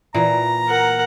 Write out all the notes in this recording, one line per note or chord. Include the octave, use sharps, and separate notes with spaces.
A#2 E3 A#3 A#5
A#4 F#5